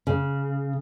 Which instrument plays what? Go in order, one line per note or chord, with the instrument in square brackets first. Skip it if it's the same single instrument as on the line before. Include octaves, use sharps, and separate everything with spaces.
[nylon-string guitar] C#3